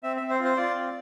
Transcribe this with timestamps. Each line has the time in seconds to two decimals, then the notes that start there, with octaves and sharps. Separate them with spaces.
0.03 C4 E5
0.17 E5
0.22 C4
0.30 C5
0.39 F4
0.44 C5
0.57 F4 D5
0.74 C4